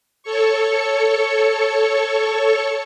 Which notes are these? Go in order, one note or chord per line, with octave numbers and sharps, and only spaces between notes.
A4 C#5 C#6